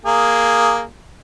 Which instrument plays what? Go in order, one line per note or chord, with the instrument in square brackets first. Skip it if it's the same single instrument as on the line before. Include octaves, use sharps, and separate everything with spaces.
[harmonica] A#3 G#4